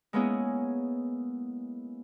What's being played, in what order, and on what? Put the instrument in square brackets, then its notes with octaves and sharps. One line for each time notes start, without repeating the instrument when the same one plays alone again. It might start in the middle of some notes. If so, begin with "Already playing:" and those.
[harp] G#3 A#3 B3 C#4 E4 G#4